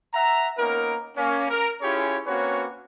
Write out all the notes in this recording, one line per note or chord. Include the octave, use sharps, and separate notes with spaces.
E5 F#5 A#5
A#3 B3 C#4 D#4 A#4
A#3 C#4
A#4
C#4 E4 F4 G4 G#4 C#5
A#3 C4 C#4 F#4 B4 C#5